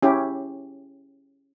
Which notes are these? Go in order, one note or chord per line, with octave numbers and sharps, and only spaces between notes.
C#4 E4 G4